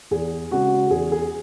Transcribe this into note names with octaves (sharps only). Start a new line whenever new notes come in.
E2 G#4
C#3 G#3 F#4
E2 G#4
G#4